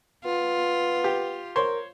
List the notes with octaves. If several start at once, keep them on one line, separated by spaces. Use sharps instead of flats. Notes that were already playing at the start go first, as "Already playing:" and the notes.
B3 F4
G4
A#4 C5 C#5 C6